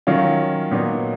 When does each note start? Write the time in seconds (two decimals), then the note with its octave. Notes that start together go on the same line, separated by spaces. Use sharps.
0.07 D#3 F#3 C#4 F4
0.71 A#2 F#3 B3 D#4